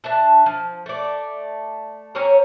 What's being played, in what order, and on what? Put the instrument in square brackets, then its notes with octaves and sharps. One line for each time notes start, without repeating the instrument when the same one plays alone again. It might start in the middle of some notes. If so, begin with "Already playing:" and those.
[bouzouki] D4 E5 A5
F3
A3 D5
C4 C#4 C#5 A#5